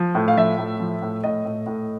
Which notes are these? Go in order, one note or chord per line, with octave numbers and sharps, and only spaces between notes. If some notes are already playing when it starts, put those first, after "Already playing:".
Already playing: F3
A2
F5
F3 E5
A2
F3
A2
A2 D#5
A2
A2